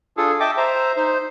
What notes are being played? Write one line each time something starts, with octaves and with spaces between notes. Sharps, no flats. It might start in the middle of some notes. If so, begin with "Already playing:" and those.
D4 F4 G#4 A4
D#5 E5 G5 A5 D6
C5 E5 A#5
D#4 C5